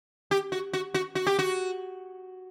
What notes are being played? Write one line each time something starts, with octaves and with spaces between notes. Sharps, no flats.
G4
F#4
F#4
F#4
F#4
G4
F#4